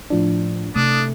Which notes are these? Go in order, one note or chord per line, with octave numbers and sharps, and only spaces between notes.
A2 F3 D4
C3 A3 D4 D#6